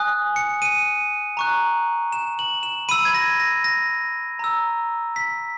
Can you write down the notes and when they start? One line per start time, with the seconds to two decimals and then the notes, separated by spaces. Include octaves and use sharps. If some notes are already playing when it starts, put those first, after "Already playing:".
Already playing: G#5 D#6 F#6
0.36 C#7
0.62 D#7
1.37 A#5 C#6 F#6
2.12 E7
2.39 F#7
2.63 E7
2.89 B5 E6 D#7
3.05 G#6
3.14 A#6
3.40 A#6
3.64 A#6
4.39 A#5 E6
5.16 B6